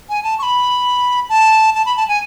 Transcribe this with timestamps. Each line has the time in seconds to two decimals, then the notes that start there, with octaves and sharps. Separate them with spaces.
0.09 G#5
0.24 A5
0.39 C#6
0.43 B5
1.29 A5
1.75 A5
1.86 B5
1.97 A5
2.08 G#5